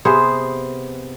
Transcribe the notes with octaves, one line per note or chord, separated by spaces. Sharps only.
C3 B3 G#4 C5